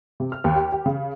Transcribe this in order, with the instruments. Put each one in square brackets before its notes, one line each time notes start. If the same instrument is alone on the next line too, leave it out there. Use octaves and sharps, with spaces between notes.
[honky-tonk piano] C3
F6
D#2
G4
G4
C#3